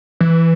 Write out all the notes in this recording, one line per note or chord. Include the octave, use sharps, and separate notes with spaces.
E3